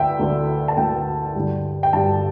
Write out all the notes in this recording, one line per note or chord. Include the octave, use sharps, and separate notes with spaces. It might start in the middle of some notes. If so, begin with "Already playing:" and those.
Already playing: D2 D3 E5 G5
D2 D3
A5
D2 D3 G5
G2 D3
G5
G2 D3 A5